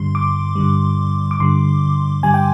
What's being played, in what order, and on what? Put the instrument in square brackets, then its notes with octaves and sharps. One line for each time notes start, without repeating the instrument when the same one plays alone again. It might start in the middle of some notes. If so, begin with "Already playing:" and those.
Already playing: [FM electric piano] G2 D3 G3 C6
D6
G2 D3 G3
D6
G2 D3 G3 C6
G2 D3 G3 G#5
G5